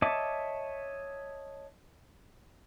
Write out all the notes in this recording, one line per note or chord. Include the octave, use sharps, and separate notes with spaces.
C#5 D#5 E5 A5 D6